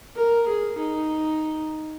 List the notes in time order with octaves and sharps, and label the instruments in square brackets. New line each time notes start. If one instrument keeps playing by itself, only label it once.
[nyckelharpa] A#4
G#4
D#4